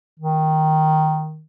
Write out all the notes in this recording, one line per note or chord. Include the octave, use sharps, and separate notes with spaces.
D#3